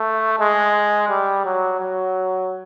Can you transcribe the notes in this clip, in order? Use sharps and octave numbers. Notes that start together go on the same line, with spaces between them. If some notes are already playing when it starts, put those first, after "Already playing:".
Already playing: A3
G#3
G3
F#3
F#3